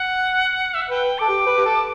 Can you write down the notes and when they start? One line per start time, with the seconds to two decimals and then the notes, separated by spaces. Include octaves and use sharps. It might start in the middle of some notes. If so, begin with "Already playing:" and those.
Already playing: F#5
0.74 E5
0.81 F#5
0.90 B4 G5
1.18 A4 D6
1.28 G4
1.46 B4
1.57 G4
1.65 A4